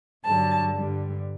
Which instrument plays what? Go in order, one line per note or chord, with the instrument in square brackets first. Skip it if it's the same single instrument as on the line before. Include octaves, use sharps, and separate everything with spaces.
[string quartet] G2 D3 F#3 A5
G2 D3 G3